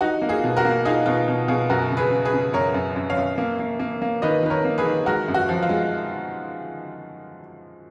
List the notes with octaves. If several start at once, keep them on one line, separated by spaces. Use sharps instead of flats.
D#4 F#4
A#3
F4 G#4
B2
F#4 A#4
A#3
D#4 F4 G#4
B2 F4
B2
B2 F4 G#4
F#2 F#4 A#4
C#3
G#4 B4
C#3
G#4 B4
C#3
F#2 A#4 C#5
F#2
F#2
C#5 F5
F#2
A#3
A#3
A#3
A#3
D#3 B4 D#5
D#3 B4
A#4 C#5
A#3
G#4 B4
D#3
G#3 F#4 A#4
F#2
F#4
F3
F4
G#3